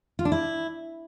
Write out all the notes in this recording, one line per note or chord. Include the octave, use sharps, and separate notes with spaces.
F4
D4
E4